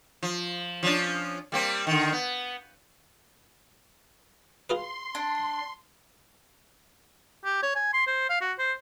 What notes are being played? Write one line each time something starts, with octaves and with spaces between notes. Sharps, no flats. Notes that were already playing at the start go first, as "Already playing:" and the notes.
F3
F3 C#4 D4
G3 A#3 C4
D3 D#3
B3
F4 G#4 B4 C6
D4
G4
C#5
G#5
C6
C5
F5
F#4
C5